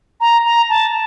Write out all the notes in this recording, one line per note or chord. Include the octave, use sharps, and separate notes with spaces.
A#5
A#5
A5